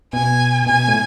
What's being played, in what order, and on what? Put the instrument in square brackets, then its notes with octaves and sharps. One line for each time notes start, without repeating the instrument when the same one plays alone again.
[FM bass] B2 [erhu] G#5
[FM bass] B2 [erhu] G#5
[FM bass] A2